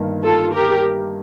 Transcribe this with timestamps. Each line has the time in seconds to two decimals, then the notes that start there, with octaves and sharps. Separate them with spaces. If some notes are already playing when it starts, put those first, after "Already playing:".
Already playing: G1 G2 D#3 A#3
0.23 F4 A4
0.53 G4 A#4